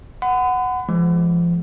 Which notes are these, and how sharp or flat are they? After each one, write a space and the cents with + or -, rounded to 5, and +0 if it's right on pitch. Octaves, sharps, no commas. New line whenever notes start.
F#5 +0 B5 +40
F3 -30 G#3 +0